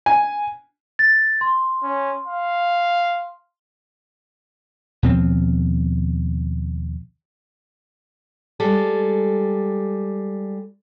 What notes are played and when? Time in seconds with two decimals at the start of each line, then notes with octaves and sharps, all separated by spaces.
0.06 G#5
0.99 A6
1.41 C6
1.83 C#4
2.27 F5
5.03 D#2 B2 F3 C4
8.60 G3 G#3 A4